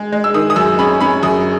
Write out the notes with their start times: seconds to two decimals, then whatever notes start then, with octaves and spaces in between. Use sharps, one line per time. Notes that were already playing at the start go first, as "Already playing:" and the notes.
Already playing: G#3
0.12 G#3
0.24 E6
0.34 D#3 D#6
0.50 D#6
0.56 F#2 E6
0.79 C#4 B5
1.01 C#4 B5
1.23 F#2 D#6